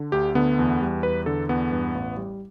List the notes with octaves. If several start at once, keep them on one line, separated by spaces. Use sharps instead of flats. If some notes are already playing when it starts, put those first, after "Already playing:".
Already playing: D3
D2 G4
D3 B3
E2
G3
E2 B4
D3 A4
E2 B3
G2
A1
G3